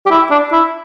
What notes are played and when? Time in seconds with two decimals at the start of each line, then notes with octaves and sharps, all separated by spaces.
0.06 G4
0.10 E4
0.31 D4
0.52 E4